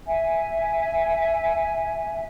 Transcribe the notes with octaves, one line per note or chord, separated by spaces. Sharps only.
E5 G#5